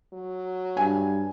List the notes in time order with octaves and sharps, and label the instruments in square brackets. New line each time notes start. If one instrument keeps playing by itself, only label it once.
[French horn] F#3
[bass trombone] G2 [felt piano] G#5